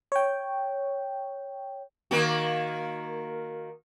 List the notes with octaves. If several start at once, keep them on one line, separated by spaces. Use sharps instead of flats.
C#5 G5
D#3 A#3 F#4